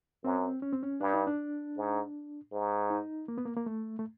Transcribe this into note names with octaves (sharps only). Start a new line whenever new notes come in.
F#2 C4
C#4
C4
C#4
G2 D4
D#4
D4
G#2
G#2
D#4
A#3
B3
A#3
A#3
A3
A3